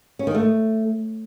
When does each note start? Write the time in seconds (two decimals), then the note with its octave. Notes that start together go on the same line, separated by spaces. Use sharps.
0.19 C#4
0.27 D#3
0.35 A3